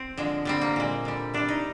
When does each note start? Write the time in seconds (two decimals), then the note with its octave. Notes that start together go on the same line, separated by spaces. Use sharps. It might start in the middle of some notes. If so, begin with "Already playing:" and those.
Already playing: C4
0.17 D3 F3 G#3
0.45 D3 G3 C4
0.62 A#3
0.76 A#2 G#3
1.05 D3 G3
1.34 C3 G3 D4
1.48 D#4